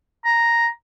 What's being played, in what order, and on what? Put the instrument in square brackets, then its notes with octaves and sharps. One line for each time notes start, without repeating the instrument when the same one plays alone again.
[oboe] A#5